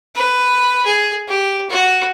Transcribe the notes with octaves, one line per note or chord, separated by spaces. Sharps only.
B4
G#4
G4
F#4